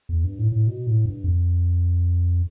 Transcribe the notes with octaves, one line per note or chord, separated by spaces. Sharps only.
E2
G2
A2
A2
B2
A2
G2
F2